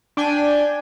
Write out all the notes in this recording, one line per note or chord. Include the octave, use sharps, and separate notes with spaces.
D4 G5 G#5